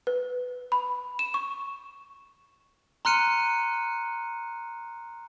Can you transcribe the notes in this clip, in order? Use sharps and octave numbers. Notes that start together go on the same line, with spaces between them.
B4
B5
E7
C#6
A#5 C6 F6 F#6 C#7 D#7